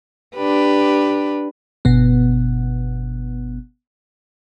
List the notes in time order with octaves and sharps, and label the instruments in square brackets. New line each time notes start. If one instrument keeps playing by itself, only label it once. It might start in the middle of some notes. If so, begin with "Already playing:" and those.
[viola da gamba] D4 G4 B4
[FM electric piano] G1 B2 B3